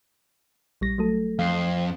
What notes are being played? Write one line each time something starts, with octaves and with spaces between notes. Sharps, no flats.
A#1 G3 A#6
F#3 A3 A4
F2 F5 C7